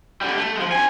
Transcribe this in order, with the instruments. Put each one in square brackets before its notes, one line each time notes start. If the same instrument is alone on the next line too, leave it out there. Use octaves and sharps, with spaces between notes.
[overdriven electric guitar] D3 G3
A3
F3 G#3
C4 G#5